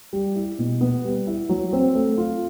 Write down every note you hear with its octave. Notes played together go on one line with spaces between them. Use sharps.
G3
E4
B2
B3
G3
E4
F#3
C4
A3
F4